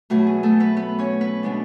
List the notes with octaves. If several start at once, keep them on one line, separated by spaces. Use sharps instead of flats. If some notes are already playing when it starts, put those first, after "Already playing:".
B2 F#3 A3 F#4
G#4
A3 A4
B3 B4
B3 B4
C#4 C#5
B3 B4
B2 G#3 B3 D4